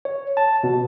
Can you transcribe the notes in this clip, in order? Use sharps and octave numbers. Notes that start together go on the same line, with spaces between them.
C#5
A5
B2